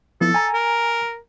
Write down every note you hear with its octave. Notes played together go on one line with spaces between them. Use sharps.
F3 B3 E4 A4
G#5 A#5
A#4